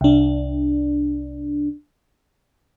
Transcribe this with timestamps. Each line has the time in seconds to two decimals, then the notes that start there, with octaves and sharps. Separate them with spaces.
0.01 C2 D4